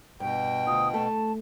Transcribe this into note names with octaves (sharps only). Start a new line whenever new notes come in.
G2 B2 G5
D2 F4 D#6
A3 A5